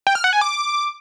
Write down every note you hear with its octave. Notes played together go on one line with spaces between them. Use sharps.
G5
F6
F#5
G#5
D6